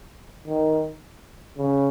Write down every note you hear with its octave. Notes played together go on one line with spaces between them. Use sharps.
D#3
C#3